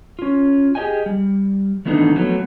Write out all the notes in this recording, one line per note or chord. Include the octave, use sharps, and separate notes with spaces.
C#4 F4
G4 G#4 C#5 D#5 G5 G#5
G3
D#3 E3 A3 B3 D4 D#4
F3 F#3 A3 B3